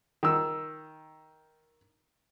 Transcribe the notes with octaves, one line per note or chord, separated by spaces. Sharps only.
D#3 E6